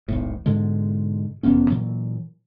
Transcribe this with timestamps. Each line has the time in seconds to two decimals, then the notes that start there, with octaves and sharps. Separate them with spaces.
0.08 E1 B1 A2
0.46 G#2 B2 D3 G#3
1.43 F1 E2 B3 C#4
1.70 A#2 E3 F#3